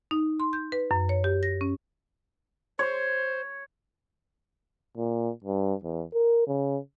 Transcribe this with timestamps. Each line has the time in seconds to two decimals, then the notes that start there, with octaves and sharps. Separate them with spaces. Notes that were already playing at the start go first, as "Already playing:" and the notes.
0.11 D#4
0.40 C6
0.53 G6
0.72 B4
0.91 F#2
1.09 C#5
1.24 G4
1.43 A#6
1.61 C#4
2.79 C5 C#5
4.97 A#2
5.44 G2
5.84 E2
6.14 A#4
6.47 C#3